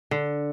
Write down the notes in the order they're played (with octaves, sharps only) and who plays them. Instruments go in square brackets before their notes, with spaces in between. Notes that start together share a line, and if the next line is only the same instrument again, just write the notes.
[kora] D3